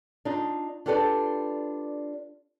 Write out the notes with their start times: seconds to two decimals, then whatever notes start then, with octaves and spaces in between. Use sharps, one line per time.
0.25 D4 D#4 F4
0.86 D4 F4 G4 A4 B4 D5